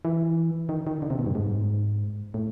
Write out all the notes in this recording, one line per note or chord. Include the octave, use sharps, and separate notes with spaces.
E3
D#3
D#3
D3
C3
B2
G2
G#2
A2